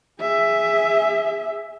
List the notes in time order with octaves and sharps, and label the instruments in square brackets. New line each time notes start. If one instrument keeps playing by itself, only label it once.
[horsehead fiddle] G#4 E5